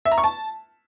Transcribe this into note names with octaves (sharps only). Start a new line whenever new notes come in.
E5
A#5
C#6
A5